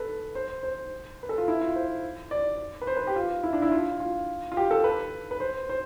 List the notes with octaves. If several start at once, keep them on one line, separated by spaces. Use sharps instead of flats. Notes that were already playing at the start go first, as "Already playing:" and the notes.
Already playing: A4 B4
C5
C5
B4
A4
F4
E4
F4
C5
D5
B4
C5
B4
G4
F4
E4
D4
E4
F4
F4
F4
G4
A4
B4
B4
C5
C5